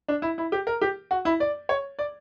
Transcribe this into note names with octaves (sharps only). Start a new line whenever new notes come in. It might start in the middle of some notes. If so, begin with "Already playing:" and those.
D4
E4
E4
G4
A#4
G4
F#4
E4
D5
C#5
D5